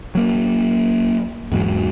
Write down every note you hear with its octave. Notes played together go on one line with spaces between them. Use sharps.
F#3 A#3
E2 G#2 F#3